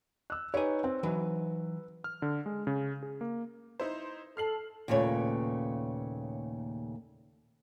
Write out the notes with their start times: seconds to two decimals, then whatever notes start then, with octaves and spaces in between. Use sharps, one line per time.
0.30 E6 F#6
0.54 D#4 G4 B4 C#5 G#5
0.84 C4
1.03 E3 F#3 D#4 B4
2.04 F6
2.22 D3
2.46 G#3
2.67 C#3
3.02 G#4
3.21 A#3
3.80 D#4 E4 C5
4.37 A4 F6 C7 F#7
4.88 D#2 A#2 C#3 A3 B4 C#5